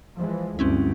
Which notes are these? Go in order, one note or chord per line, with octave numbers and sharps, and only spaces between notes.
E3 F3 G#3
D2 G2 C4 C#4 E4